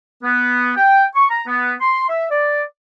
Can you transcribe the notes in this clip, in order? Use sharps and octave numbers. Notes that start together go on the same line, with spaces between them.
B3
G5
C#6
A#5
B3
C6
E5
D5